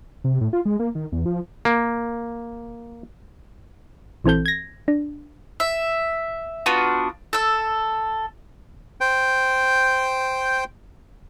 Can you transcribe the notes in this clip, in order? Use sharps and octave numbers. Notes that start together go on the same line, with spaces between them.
C3
A2
F4
G#3
A#3
D#3
E2
F3
A#3
A#1 E3 C4 A4 G6
G#6 A#6
D4
E5
B3 D4 F4 F#4
A4 E6
C5 G5